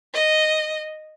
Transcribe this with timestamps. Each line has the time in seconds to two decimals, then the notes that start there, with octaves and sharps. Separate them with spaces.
0.14 D#5